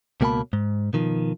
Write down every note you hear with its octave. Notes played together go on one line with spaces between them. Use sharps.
C#2 B2 A#3 F#5 A5 B5
G#2
B2 D#3 F3